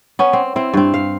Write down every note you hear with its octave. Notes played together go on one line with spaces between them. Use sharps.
B3 C#4
C4
C4 E4
G2 C4
F5